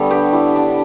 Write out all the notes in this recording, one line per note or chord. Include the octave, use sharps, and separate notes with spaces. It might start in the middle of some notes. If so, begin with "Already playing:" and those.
Already playing: D3 G3 B3 A4 C#5
G4 B4
E4 G4
D4